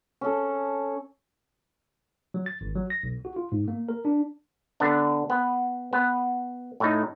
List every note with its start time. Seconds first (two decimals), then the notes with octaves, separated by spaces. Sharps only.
0.21 C#4 A4
2.34 F#3
2.46 A6
2.61 G#1
2.75 F#3
2.90 A#6
3.03 B1
3.25 F#4
3.36 F4
3.52 G#2
3.68 A#3
3.89 A#4
4.05 D4
4.80 D3 B3 D4
5.30 B3
5.93 B3
6.80 A2 A3 D#4